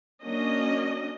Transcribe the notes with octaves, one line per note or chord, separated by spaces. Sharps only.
F#3 A#3 C#4 D4 D#5